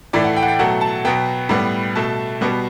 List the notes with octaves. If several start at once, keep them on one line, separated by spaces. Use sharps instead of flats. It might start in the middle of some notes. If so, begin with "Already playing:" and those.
A2 E3 A3 D5
F#5
G5
F#5
G5
B2 F#3 A3 F#5
A5
B2 F#3 B3 G5
A2 G3 B3
B2 A3 A5
B2 G3 B3